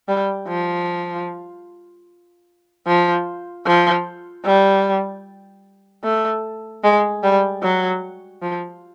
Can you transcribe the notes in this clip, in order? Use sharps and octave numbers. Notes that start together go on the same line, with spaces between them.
G3
F3
F3
F3
G3
A3
G#3
G3
F#3
F3